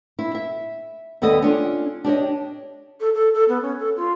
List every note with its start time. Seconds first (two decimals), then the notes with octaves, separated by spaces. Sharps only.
0.19 E4
0.35 E5
1.22 D#2 G3 B3 A4 D#5
1.42 C#4 D4 F4
2.04 D4 G4 C#5 D#5
3.00 A4
3.14 A4
3.34 A4
3.49 B3
3.62 C#4
3.79 A4
3.96 F4